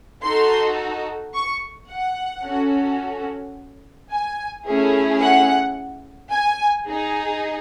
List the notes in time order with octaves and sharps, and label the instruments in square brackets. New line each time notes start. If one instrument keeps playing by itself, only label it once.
[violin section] D#4 F#4 A4 C6
C#6
F#5
C#4 F#4 A4
G#5
A3 C#4 E4 G#4
F#5
G#5
D#4 G#4